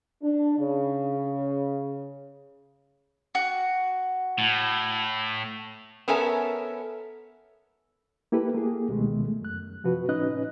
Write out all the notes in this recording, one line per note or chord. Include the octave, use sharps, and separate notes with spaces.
D4
C#3
F#4
A2
B3 C#4 A4 A#4 E5 G#5
A#3 E4 G4 A4 B4
A#3 G4 G#4
C#2 B2 D#3 G#3 A3
F#2 F#6
C3 F3 F#4 B4
A2 C#4 D#4 B4 D#5 F#6